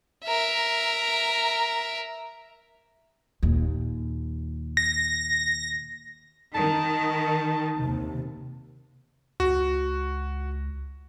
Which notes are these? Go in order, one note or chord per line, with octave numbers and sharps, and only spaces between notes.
A#4 E5
D#2 A#2
A#6
D#3 A5
D#2 C3
C#2 F#4